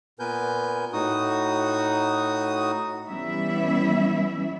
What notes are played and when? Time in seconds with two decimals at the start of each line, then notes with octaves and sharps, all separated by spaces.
0.19 A#2 B3 A#4 B4 G#5 G6
0.93 A2 D#4 F#4 D#6
3.06 E3 G3 B3 C#4 E4 E5